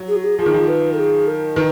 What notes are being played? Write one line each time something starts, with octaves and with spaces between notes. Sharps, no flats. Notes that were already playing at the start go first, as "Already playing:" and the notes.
Already playing: F#3
G#4
F#4
G#4
F3 G#4
D#3
F3
B4
G#4
A#4
D#3 B4